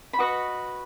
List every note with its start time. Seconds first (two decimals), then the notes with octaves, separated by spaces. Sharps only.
0.13 B5
0.19 F#4 B4 D#5 C#6